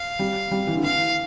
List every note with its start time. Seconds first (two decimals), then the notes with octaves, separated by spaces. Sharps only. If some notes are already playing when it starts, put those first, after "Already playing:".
Already playing: F5
0.19 G3
0.51 G3
0.67 E3
0.75 D3
0.83 E3 F5